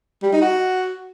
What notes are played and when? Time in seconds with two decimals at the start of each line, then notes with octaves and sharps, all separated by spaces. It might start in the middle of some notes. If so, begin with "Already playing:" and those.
0.23 G3
0.32 D#4
0.42 F#4